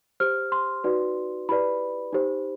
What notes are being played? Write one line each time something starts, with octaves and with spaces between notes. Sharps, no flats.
G4 C5 F6
C6
D#4 F#4 B4 D5
E4 G4 B4 D5 B5
D#4 G4 C5